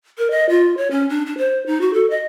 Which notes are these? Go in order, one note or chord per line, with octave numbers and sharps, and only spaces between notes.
A#4
D#5
F4
C#5
C#4
D4
D4
C5
D#4
F#4
A4
D#5